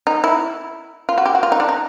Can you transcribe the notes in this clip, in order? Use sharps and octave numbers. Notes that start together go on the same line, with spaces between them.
D#4
E4
F4
F#4
G4
F#4
F4
D#4
D4
D#4